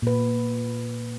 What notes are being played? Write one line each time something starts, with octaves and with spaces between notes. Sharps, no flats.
A#2 B4